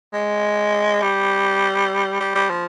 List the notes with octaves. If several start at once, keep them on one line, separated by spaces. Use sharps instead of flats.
G#3
G3
G3
G3
F3